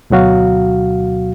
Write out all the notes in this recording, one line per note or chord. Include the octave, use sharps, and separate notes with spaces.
D2 B2 F#3 F#4 F5